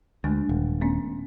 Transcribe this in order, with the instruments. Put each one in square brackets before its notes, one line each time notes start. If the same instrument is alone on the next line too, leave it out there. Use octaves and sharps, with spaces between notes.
[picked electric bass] D2 [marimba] G#3 A3 D4
[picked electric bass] D#1
[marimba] A3 B3 C#4